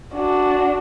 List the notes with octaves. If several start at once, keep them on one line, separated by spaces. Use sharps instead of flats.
D4 F#4